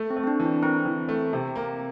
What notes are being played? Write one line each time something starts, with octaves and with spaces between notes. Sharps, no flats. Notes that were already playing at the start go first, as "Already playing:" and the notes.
Already playing: A3
C4
A3
C4
D4
E3
D4
C4 A#4
E3
A3
C3
A#3